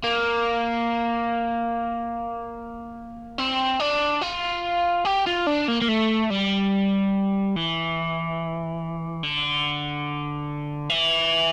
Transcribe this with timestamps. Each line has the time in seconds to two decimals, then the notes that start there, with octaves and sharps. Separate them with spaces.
0.04 A#3
3.38 C4
3.80 D4
4.22 F4
5.05 G4
5.27 F4
5.47 D4
5.68 A#3
5.82 A#3
5.88 A3
6.30 G3
7.56 E3
9.23 D3
10.90 E3